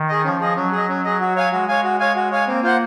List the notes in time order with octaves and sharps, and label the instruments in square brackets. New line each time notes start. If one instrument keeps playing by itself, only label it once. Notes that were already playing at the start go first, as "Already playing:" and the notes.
Already playing: [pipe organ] D#3
[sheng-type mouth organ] G#4 D#5
[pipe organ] F3 [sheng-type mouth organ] C#4
[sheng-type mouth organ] G#4 D#5
[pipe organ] F#3 [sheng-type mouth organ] C#4
[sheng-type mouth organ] G#4 D#5
C#4
G#4 D#5
F#4
C#5 F5 G#5
[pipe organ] G#3 [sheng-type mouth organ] F#4
[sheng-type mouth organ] C#5 F5 G#5
F#4
C#5 F5 G#5
F#4
C#5 F5 G#5
[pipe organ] A#3 [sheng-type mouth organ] C4
[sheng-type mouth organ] F4 C5 F#5